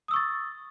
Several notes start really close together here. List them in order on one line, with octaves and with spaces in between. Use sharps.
D#6 E6 C#6 A6